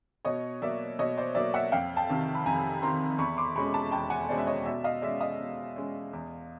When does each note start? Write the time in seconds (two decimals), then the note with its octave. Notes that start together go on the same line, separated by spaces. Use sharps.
0.25 B2 C#5 D#5
0.62 F#3 A#3 D5 E5
0.99 B2 C#5 D#5
1.17 C5 D5
1.35 F#3 A#3 D5 E5
1.54 E5 F#5
1.72 F2 F5 G5
1.97 G5 A5
2.09 C3 D#3
2.35 B5
2.46 F2 G#5 A#5
2.82 C3 D#3 A#5 C6
3.18 E2 B5 C#6
3.37 C6 D6
3.55 B2 G#3 C#4 B5 C#6
3.74 A5 B5
3.92 E2 G5 A5
4.10 F#5 G#5
4.29 B2 G#3 C#4 C5 D5
4.38 E5
4.47 C#5 D#5
4.65 B2 D5 E5
4.84 D#5 F5
5.02 G#3 C#4 D5 E5
5.20 D#5 F5
5.40 B2
5.76 G#3 C#4
6.13 E2